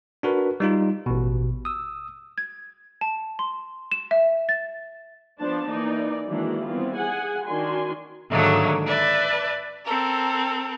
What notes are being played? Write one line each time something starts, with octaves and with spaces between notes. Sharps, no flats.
D4 F#4 A#4 B4
G3 D#4 F4
A1 B2
D#6 E6
G#6
A5
C6
E7
E5
A6
F3 B3 D4 C5 A5
E3 A#3 D#4 D5
D#3 E3 F#3 G#3 A#3 D4
E3 G3 B3 C4 F4
G#4 F#5 G#5
D#3 D4 F#4 G#5 C6
G#2 D3 D#3 F#3 A3 A#3
B4 D5 E5 A5
C4 A4 A#4